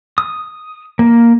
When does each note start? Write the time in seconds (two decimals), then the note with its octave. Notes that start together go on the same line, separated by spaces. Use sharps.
0.18 D#6
0.99 A#3